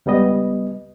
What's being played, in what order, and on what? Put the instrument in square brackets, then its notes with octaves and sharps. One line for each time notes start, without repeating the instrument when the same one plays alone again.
[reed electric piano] C#2 G3 B3 D#5